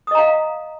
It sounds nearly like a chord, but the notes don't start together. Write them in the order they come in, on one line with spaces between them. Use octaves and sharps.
D#6 D#5 A#5 F5